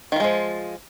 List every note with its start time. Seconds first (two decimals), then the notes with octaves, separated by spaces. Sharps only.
0.12 D#3
0.16 F4
0.20 G#3
0.24 F3